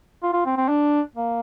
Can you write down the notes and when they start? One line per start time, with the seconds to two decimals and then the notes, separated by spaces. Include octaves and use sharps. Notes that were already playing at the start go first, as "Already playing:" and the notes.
0.23 F4
0.33 F4
0.46 C4
0.57 C4
0.68 D4
1.15 A#3